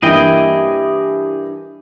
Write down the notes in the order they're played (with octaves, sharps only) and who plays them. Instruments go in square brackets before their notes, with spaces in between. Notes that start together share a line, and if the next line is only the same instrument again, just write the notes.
[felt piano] G2 E3 A#3 [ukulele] E4 [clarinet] G4 [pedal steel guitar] G#4 D#5 G5